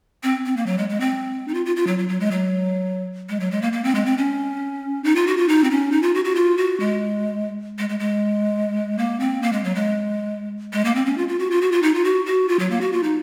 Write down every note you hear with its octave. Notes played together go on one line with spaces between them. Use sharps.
C4
C4
A#3
F#3
G#3
G#3
C4
D#4
F4
F4
F4
F#3
F#3
F#3
G#3
F#3
G#3
F#3
G#3
A#3
A#3
C4
G#3
C4
C#4
D#4
F4
F#4
F4
D#4
C4
C#4
D#4
F4
F#4
F#4
F4
F#4
G#3
G#3
G#3
G#3
A#3
C4
A#3
G#3
F#3
G#3
G#3
A#3
C4
C#4
F4
F4
F#4
F4
F#4
F4
D#4
F4
F#4
F#4
F4
F#3
A#3
F#4
F4
D#4